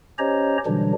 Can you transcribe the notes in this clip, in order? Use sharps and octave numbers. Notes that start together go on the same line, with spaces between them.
C#4 G4 C5 C#5 D#5 A#5
B2 D3 E3 F#3 G3 D4